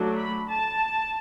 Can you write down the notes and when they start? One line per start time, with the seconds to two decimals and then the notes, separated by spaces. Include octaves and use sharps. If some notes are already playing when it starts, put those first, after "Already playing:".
Already playing: F#3 A3 D4
0.18 B5
0.49 A5